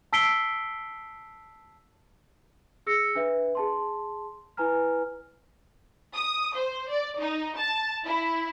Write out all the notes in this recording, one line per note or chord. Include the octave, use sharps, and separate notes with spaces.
A5 E6 B6 C7 D7 G7
G#4 E6 A#6 C#7
D4 B4 E5
G#4 A5 C6
E4 B4 G#5 A#5 F6
D#6
C5
D5
D#4
A5
E4